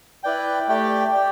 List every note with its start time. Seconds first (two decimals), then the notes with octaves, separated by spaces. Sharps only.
0.24 E4 B4 D5 G5
0.68 A3 G4 D5 G5
1.13 G4 D5 G5